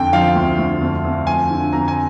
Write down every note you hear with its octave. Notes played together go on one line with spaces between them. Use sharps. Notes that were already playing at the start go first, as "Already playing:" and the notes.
Already playing: F2 D3 G5
F3 F5
D2
D2
F2
F2
F3 G#5
D3
F2 A#5
G#5